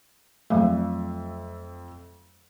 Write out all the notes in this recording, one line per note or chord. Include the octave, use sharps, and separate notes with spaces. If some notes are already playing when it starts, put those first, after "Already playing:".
F2 F#3 A3 E5